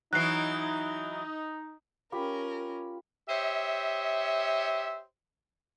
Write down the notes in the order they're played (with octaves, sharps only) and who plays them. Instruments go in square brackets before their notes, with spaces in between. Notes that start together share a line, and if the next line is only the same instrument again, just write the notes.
[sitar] E3 F#3 [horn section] D#4 [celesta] F#6 C7
[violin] C#4 A#4 [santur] F4 G4 B5
[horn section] G4 C5 C#5 D#5 E5